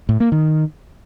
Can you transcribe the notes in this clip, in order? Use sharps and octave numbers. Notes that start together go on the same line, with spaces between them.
A2
A#3
D#3